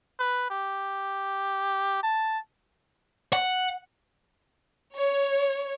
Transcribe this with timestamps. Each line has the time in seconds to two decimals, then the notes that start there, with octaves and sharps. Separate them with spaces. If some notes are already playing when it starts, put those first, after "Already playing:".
0.20 B4
0.50 G4
2.03 A5
3.33 F#5
4.97 C#5